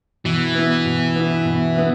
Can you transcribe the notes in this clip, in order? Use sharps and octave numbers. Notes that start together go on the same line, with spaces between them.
B2 E3
B3 E4
B2
B3 E4
B2
B3 E4